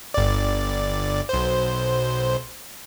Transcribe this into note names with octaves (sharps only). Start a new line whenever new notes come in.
G1 D5
B1 C5